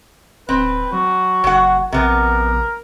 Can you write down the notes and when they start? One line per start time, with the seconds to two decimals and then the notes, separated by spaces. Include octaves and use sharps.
0.49 D1 C4 B4
0.92 F#3 F#4
1.44 F#1 F#3 F#5
1.92 A#1 C3 B3 A#4